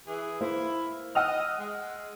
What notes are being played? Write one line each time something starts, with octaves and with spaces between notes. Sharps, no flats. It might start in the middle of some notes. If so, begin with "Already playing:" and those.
E3 G#4
A#3 E4 A#4 C5
D#5 F#5 E6 F6
G#3